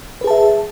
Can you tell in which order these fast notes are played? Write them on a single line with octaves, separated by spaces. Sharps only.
B4 G#4 A5 E5